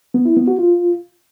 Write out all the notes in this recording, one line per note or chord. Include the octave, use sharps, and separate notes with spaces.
B3
E4
B3
F#4
F4